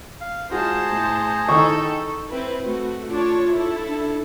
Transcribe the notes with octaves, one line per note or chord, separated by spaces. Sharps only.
F5
G#3 F4 F#4 G#4 C5 A5 A#5
A2
D#3 D#4 E4 A4 C#6
C4 E4 B4
A3 F#4
D4 F4 C#5
E4 A4
D4